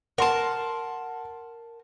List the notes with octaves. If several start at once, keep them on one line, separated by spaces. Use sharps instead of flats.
A#4 F#5 A5 C6